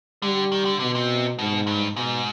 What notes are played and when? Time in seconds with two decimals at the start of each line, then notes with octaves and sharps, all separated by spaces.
0.22 D3 G3
0.52 D#3
0.65 D3
0.80 B2 D3
0.95 C3
1.39 G#2 B2
1.67 G2
1.96 G#2 B2